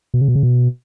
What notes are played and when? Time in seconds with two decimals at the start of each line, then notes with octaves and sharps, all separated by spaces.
0.14 B2
0.21 C#3
0.28 B2
0.35 C#3
0.43 B2